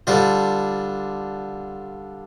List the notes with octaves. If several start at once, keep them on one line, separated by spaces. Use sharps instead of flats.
D3 G3 D4 F4 C5